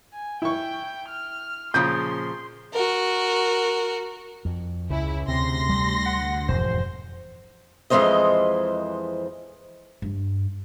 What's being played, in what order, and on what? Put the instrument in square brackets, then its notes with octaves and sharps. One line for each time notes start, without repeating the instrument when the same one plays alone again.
[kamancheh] G#5
[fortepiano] E4 C#6 [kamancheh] G5
[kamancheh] F6
[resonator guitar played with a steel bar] A#2 C#3 F3 [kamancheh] C6 [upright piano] G6
[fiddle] F#4 A#4
[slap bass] F2
[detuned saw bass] C#2 [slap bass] C#3 [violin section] E4
[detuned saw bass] D2 [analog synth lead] C3 [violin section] C6 A#6
[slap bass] G3 A3
[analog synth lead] F#5
[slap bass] E1 F2 G#2 [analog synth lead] C5
[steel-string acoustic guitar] F2 E3 G#3 A#3 C5 D#5
[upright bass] G2